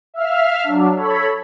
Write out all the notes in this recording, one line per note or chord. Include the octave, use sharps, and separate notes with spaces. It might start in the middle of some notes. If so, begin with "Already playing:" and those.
E5 F5 F6
F#3 D4
A4 C#5 B5